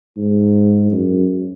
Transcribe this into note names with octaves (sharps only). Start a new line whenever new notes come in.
G#2
F#2